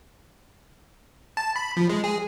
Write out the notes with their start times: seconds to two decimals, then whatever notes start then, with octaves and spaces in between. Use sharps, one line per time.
1.37 A5
1.56 B5
1.77 F3
1.89 G#3
2.04 G#4